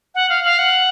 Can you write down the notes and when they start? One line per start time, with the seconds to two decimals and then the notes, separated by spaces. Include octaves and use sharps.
0.15 F#5
0.29 F5
0.44 F5
0.59 F#5